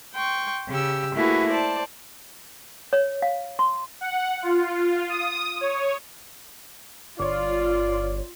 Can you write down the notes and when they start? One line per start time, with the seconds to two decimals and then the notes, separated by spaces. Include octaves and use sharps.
0.14 G5 C6 C#6
0.69 C#3 G4 E6
1.16 A3 A#3 E4 F#4 G#4 B4
1.51 C5 D5 A5
2.93 C#5
3.22 F5
3.59 C6
4.01 F#5
4.42 F4
5.09 D#6
5.61 C#5
7.20 G1 F4 C#5 D5